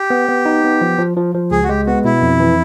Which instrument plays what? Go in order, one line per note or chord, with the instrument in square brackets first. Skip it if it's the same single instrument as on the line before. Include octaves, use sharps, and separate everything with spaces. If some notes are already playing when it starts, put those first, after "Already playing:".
Already playing: [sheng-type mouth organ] G4
[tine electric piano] B3
B3
D#4
B3
F3
F3
F3
F3
[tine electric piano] C#2 [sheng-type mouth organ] G#4
[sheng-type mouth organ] F#4
[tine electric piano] G#3 [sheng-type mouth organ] G4
[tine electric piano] B3 [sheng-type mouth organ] F#4
[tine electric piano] B2 [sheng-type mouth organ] E4
[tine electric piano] F2
E3